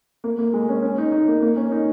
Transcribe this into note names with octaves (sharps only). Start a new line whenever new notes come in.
A#3
A#3
G#3
C#4
C#4
D#4
D#4
A#3
A#3
C#4
D#4